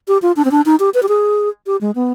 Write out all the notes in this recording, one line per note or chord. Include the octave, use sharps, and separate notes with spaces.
G4
F4
D4
C4
D4
D#4
G4
B4
G4
G#4
G4
G#3
B3